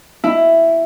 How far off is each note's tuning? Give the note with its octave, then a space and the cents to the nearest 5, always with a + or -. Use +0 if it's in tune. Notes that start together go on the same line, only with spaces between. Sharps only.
E4 +5